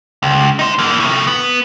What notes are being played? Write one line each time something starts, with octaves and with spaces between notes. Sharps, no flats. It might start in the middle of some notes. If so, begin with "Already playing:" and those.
C#2
D#4 C5
E3 A#3
A2 C3
B3